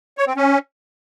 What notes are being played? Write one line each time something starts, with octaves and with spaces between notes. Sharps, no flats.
C#5
C4
C#4